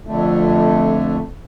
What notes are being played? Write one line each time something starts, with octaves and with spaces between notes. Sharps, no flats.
F2 D3 A3